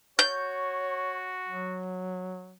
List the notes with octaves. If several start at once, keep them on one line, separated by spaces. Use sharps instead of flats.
F#4 C#5 G6
F#3